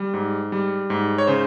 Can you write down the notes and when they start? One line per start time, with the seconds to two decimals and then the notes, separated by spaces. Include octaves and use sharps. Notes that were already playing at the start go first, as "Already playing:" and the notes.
Already playing: G3
0.14 G#2
0.52 G3
0.90 G#2
1.18 C#5
1.27 C#3 C5